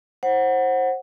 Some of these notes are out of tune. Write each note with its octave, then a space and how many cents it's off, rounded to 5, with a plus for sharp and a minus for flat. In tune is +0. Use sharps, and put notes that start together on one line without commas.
C5 +25 F#5 +0